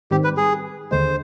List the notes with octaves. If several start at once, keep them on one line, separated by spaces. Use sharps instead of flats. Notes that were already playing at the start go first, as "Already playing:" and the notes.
G#2 D#3 G3 C4 G4
B4
G#4
D#2 D3 G#3 C5